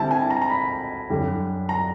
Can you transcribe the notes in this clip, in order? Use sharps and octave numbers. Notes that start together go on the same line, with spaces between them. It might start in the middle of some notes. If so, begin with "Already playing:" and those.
Already playing: D3 G3 C4 E4 A5
G#5
A#5
A#5
B5
F#2 D3 G3
A#5